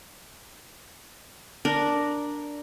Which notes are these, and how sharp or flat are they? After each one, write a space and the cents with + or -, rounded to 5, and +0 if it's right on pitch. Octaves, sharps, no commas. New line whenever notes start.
D4 +0 A#4 +0